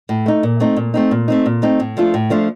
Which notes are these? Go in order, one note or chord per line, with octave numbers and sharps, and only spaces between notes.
A2
A3 D#4
A#2
A3 C4 D#4
A#2
A3 C4 D#4
A#2
A3 C4 D#4
A#2
A3 C4 D#4
A2
F3 A3 D4 F4
A2
F3 A3 D4 F4